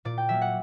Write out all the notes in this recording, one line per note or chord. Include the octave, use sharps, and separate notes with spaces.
A#2 D5
G5
F#3 A#3 E5
F#5